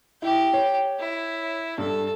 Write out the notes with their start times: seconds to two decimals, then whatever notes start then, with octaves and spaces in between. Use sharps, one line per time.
0.22 E4 G4 G5
0.53 C#5
0.99 E4
1.78 G2 A4